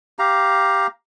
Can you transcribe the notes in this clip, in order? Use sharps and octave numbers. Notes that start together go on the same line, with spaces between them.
G4 F5 A#5